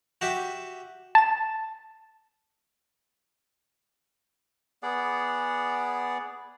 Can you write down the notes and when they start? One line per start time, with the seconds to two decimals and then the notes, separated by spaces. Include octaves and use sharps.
0.21 F#4 G4 E5
1.15 A5 E7
4.83 B3 G#4 D5 F#5